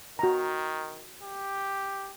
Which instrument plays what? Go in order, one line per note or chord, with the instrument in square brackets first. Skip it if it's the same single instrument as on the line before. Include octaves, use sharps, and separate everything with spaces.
[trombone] D#3 [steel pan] F#4 A#5
[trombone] G4